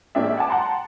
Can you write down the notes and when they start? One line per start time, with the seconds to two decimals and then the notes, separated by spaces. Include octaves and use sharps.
0.15 A1 G#3 A#3 D4 G4 E5
0.37 F#5 G#5 A5 D6
0.50 F#5 G5 A5 A#5 C6